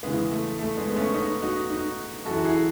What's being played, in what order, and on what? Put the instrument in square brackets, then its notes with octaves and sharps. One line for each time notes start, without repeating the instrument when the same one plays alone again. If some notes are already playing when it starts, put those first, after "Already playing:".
[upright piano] E2 C#3 E3 G#3 B3
A3
A3
G#3 B3
B3
A3 C#4
B3 D#4
D#4 F#4
D#4 F#4
F#2 F#4 A4
E3
F#4
E4 G#4